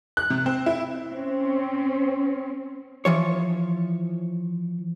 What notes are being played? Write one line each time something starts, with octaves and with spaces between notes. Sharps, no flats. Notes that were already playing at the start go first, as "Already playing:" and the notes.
F#6
C3
C4
E4
C4 C#4
E3 F3 C#5